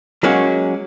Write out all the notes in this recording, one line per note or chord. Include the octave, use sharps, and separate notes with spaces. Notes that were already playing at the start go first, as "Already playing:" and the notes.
F#3 G#3 A#3 C#4 F#4